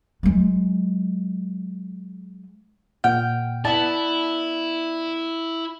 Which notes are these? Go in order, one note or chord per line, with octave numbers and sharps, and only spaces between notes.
F#3 G#3
A#2 F#5 G5 F6
B3 E4 D5 A5